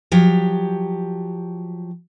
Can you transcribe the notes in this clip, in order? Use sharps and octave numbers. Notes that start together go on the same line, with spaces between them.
F3 F#3 G4